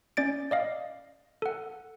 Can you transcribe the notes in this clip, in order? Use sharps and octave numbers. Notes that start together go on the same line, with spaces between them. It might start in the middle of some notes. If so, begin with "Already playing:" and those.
C#4 D5 A6 D7
D5 D#5 F5
A4 F#5